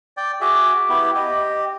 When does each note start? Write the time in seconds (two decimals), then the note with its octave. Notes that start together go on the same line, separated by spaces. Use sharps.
0.17 D5 G5
0.41 F#4 G#4 E5 D6
0.89 B3 E4 G4
1.15 G4 D#5